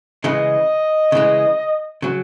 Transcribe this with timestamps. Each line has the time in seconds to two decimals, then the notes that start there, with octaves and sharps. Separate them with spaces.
0.24 C#3 E3 G#3 D#5
1.12 C#3 E3 G#3
2.02 C#3 F#3